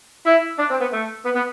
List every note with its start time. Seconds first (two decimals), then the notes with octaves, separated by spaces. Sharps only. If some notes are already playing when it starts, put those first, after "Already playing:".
0.26 E4
0.59 D4
0.71 C4
0.81 B3
0.93 A3
1.25 B3
1.35 B3